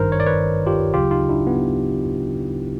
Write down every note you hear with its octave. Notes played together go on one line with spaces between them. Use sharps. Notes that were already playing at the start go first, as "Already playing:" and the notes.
Already playing: G#1 G2 D#3 A#4 C5
C#5
D5
B4 C#5
F4 G4
D2 C#3 F#3 F4 G4
D#4 F4
D4 E4
B3